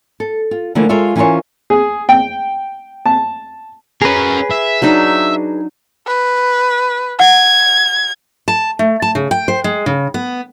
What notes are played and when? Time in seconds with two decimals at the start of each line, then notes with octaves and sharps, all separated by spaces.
0.20 A4
0.51 F4
0.75 D3 E3 F3 A3 A#3 E4
0.89 G#3 F4 A4 A#4 C#5 E5
1.16 E3 C#4 F4 A#4 C5 C#5
1.70 G#4
2.09 G5
3.06 A5
4.02 C#4 G#4 A#4 B4
4.51 E5
4.82 F#3 D4 D#4
6.07 B4
7.20 F#5 G#6
8.48 A5
8.79 A3
9.02 A5
9.15 C#3
9.31 G5
9.48 C5
9.64 G#3
9.86 C#3
10.14 B3